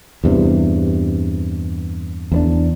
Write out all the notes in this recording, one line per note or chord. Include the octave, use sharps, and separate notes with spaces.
E2 G2 C3
E2 B3 D4